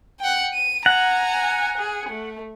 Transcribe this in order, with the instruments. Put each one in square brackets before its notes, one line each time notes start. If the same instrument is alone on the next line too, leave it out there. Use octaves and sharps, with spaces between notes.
[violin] F#5 G5
D#7
[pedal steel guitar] F#5 [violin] G#5 A#5
[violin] G#4
A3